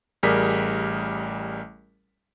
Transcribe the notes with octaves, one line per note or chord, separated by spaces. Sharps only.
A1 G3 G#4 A#4 B6